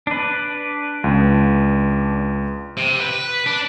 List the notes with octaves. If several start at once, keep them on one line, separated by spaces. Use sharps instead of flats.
D4 B4
C#2
C3
B4
D4